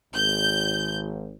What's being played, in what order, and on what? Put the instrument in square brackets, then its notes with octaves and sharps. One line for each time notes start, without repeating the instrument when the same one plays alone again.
[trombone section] G#1 [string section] G6